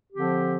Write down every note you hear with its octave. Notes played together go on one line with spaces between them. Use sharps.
D3 F3 C4 G4